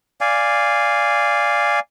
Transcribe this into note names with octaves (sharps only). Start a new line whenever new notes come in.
D5 F5 G#5